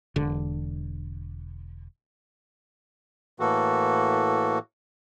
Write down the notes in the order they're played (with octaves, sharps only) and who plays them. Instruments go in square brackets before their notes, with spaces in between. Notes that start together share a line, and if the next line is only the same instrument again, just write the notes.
[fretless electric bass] E1 D3
[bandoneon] A2 E3 A#3 F#4 A4